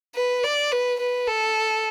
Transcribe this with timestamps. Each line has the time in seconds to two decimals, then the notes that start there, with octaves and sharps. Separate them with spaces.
0.15 B4
0.44 D5
0.72 B4
0.99 B4
1.27 A4